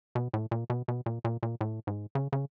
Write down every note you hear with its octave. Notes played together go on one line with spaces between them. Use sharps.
B2
A2
A#2
B2
B2
A#2
A#2
A#2
A2
G#2
C#3
C#3